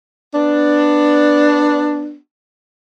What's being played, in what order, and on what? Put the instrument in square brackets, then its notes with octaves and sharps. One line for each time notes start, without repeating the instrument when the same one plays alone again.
[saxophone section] B3 D4